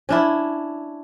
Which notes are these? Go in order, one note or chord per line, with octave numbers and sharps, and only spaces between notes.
C#4 D4 E4